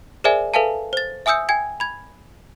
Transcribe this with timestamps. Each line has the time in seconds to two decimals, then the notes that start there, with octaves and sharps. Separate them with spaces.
0.24 G#4 A#4 C5 D5 E5 G#5
0.54 A4 B4 E5 F5 G#5 A5
0.93 C5 A6
1.26 E5 G#5 D#6 E6 G6 C#7
1.49 G5 G#5 G#6
1.80 B5 G#6